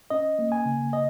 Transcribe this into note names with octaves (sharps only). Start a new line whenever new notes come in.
C#4 D#5
A#3
G#5
C#3
D#5